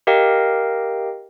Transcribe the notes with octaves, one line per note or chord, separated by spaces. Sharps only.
G4 A#4 D#5 F5 G5